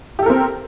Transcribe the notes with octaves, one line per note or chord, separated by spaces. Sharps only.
C4 G4 A4 A#4